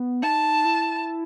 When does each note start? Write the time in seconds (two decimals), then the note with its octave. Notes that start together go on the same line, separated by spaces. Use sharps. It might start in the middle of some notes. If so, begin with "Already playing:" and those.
Already playing: B3
0.23 D#4 A5
0.65 E4